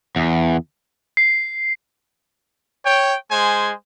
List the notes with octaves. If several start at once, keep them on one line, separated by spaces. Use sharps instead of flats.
E2
C7
C#5 G5
G#3 C5 G#5